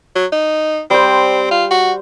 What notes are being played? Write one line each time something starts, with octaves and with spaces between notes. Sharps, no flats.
F#3
D#4
G3 C4 C5
F4
F#4